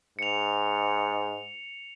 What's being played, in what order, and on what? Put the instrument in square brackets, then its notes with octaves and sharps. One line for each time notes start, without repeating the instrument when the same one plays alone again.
[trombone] G#2 [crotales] C#7 F7